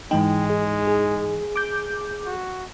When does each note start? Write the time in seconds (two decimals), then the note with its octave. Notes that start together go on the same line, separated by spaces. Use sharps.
0.11 G#2 E3 G#3 D#4 G5
0.50 G#4
0.87 G#4
1.56 D6 G6
2.26 F#4